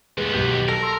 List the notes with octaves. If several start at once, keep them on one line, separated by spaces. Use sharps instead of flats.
D#2 G#3 B3 B4
B1 G4 G6
A4 A#4 A#6
A5 C6 E6